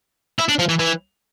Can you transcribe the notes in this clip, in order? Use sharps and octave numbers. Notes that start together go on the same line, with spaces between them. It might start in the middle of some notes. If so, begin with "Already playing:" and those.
E4
D4
F3
E3
E3